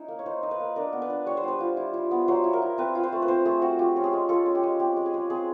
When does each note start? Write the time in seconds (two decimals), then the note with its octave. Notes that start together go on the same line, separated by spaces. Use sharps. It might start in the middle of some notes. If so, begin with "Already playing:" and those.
Already playing: C#4 D#4 E4
0.08 A#3
0.19 C#5
0.26 D#4 C5
0.43 D#4
0.51 B4
0.60 A#3
0.76 D4 A#4
0.93 B3
1.02 B4
1.10 D4
1.26 G3 C#5
1.37 C5
1.43 G3 B4
1.59 F4 C5
1.77 E4
1.94 E4
2.11 B3
2.28 F#3 C5
2.44 E4
2.53 A#4
2.62 E4
2.78 C4 B4
2.95 F4
3.03 C5
3.12 A3
3.22 B4
3.28 C4 C5
3.45 A3 G#4
3.62 C4 F#4
3.79 F4 G4
3.96 C#4
4.04 G#4
4.13 G#3
4.29 F4 A4
4.46 C#4
4.55 G4
4.63 G#3
4.80 C4 G4
4.97 G#3
5.06 G#4
5.14 G#3
5.30 C4 G#4